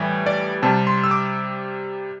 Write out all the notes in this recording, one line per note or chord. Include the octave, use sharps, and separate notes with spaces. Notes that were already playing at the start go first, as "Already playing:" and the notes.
Already playing: A2 E3 G3
D5
C3 G3 A5
C6
E6
D6